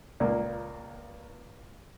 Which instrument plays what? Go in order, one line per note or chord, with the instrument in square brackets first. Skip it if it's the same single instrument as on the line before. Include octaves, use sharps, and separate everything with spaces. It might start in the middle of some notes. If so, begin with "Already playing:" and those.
[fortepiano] C#2 A#2 A#3 [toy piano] D5